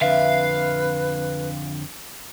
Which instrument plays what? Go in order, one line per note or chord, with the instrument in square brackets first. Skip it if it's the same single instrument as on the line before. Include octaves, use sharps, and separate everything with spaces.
[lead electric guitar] F2 D3 [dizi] B4 [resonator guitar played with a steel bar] E5 [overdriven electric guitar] F5